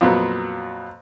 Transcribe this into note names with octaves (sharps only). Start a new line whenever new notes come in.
F2 A#2 F#3 B3